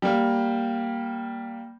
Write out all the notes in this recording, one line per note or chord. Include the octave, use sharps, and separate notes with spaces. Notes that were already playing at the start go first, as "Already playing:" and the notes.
G3 A#3